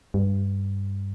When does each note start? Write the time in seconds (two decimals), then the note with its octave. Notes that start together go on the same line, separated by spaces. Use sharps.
0.14 G2